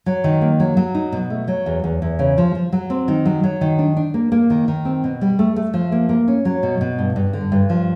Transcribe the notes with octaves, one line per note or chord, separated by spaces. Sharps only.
F#3
D#3
A#3
F#3
F#3
D#4
B2
A3
F#3
E2
E2
E2
C#3
F3
F3
F#3
C4
D#3
F#3
F#3
D#3
D4
D4
A#3
A#3
D#3
D#3
C4
B2
G3
A3
A3
F3
A#3
A#3
C#4
F#3
B2
B2
G2
G2
D3
G2
F3